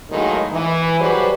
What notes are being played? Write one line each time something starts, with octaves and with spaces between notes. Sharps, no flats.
A2 D#3 F#3 G#3 A#3
E3
F#3 G3 G#4 B4 C5